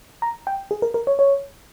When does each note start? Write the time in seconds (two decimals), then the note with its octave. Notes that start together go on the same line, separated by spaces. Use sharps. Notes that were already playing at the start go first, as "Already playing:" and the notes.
0.22 A#5
0.47 G5
0.71 G#4
0.82 A#4
0.94 A#4
1.07 C#5
1.19 C#5